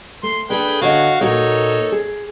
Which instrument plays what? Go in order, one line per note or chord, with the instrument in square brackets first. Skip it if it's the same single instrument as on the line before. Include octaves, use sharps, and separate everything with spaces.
[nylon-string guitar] A3 [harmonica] C6
[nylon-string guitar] D4 A4 [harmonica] G#4 B4 G5
[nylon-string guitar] D3 C#5 D#5 [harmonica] F#4 F5
[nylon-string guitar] A#2 F#4 A#4 [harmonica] D#4 A4 C#5
[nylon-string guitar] G#4